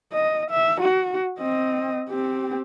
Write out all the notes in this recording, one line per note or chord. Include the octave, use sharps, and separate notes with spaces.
D#5
E5
F#4
C4 D#5
C4 G4